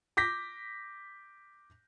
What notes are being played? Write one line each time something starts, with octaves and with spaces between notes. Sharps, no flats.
D6 G6 A#6 B6